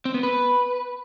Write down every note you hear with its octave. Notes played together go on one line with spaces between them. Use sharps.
C4
B3
B4